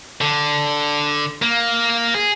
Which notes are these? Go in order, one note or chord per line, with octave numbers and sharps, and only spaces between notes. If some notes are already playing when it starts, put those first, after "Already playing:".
D3
A#3
G#4